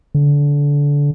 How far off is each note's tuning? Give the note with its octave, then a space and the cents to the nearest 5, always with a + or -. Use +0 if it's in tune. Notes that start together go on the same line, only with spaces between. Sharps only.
D3 -25